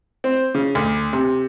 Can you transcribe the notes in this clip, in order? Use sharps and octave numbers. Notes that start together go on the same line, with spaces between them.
C4
C#3
D2
C3